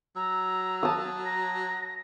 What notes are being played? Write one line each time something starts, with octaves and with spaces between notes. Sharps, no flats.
F#3 A#5 E6
A5 D#6
A#5 A#6